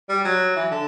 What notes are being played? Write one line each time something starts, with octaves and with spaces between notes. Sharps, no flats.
G3
F#3
E3
D3